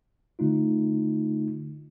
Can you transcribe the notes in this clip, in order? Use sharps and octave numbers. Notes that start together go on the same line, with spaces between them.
D3 A3 D#4 F4